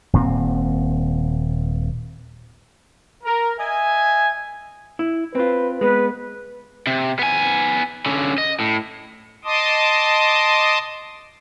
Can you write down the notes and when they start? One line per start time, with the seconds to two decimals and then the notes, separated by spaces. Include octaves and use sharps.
0.13 D#1 A#2 A#3 C4
3.24 A#4
3.58 D#5 E5 G#5
4.99 E4
5.35 C4 F4 B4
5.81 G#3 B3 B4
6.87 C3
7.19 B3 G#5
8.06 D3 C#4
8.38 D#5
8.60 A2
9.44 D#5 A5 C6 D6 D#6